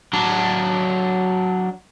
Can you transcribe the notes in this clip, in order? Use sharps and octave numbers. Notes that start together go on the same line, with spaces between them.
F#3 D4